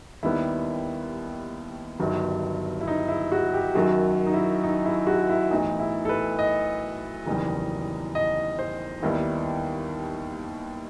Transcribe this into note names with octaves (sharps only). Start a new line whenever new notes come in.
D#2 D#3 G3 B3 E4
G1 G2 D#3 F#3
E4
D#4
E4
F#4
G4
F#2 D#3 F#3 F#4
D#4
E4
D#4
E4
F#4
E4
B1 A2 E3 D#4
E4
A4
B4
D#5
F#1 E2 D#3 G3
D#5
C5
D#2 D#3 G3 B3 E4